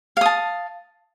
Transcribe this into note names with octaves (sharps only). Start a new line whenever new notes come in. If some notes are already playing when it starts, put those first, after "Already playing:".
F5 A5 D#6